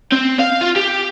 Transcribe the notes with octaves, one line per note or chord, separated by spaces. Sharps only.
C4
F5
F4
G4